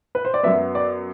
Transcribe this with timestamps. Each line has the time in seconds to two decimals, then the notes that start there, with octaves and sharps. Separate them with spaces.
0.15 B4
0.25 C5
0.34 D5
0.43 F#2 F#3 B3 E5
0.75 D5